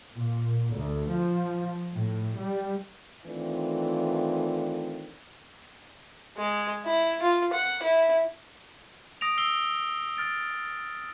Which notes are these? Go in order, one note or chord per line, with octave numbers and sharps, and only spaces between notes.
A#2
D2
F3
A2
G3
D#3 E3 A3 C4 D4 F4
G#3
E4
F4
F#5
E4
D#6 A#6 D7 F7
E6 C7 G7
F6 A6 D7